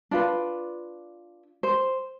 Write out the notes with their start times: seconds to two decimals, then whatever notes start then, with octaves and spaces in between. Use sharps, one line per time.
0.11 D4 F4 B4
1.63 C5